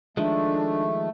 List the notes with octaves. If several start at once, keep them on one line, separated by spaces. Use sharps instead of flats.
D#3 F3 G#3 A3 D4